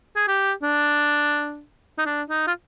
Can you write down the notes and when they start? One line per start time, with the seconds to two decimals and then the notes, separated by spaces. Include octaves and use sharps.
0.16 G#4
0.28 G4
0.63 D4
1.98 D#4
2.06 D4
2.29 D#4
2.47 F4